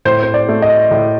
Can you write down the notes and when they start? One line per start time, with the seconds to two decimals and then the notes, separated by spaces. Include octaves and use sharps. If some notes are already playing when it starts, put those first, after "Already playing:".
0.05 A2 C5
0.23 C5
0.34 D5
0.49 A3
0.62 D#5
0.91 A2